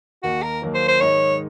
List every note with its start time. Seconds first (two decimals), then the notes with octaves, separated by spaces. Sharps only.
0.23 D#2 D#3 A#3 F#4
0.42 A#4
0.62 D#2 D#3 F#3 A#3
0.75 C5
0.88 C5
1.01 G#2 D#3 G#3 D#4 C#5